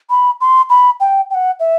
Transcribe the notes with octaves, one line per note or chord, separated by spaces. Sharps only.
B5
C6
B5
G5
G5
F#5
E5